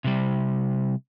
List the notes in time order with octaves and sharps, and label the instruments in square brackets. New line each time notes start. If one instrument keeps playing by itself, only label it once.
[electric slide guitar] C3 G3